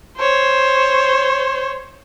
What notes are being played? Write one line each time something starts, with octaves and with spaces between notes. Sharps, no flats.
C5 C#5